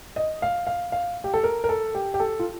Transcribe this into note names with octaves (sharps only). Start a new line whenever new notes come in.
D#5
F5
F5
F5
G4
A4
A#4
A#4
A4
G4
G4
A4
F4